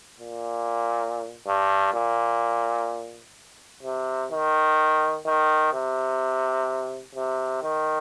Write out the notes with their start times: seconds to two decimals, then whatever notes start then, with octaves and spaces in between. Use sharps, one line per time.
0.20 A#2
1.47 G2
1.94 A#2
3.83 C3
4.31 D#3
5.26 D#3
5.73 C3
7.15 C3
7.63 D#3